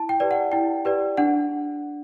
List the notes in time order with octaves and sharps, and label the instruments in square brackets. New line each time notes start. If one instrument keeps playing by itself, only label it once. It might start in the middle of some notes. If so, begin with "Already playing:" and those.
Already playing: [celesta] E4 A5
G5
G4 B4 D5
F#5
E4 G5
G4 B4 D5
D4 F#5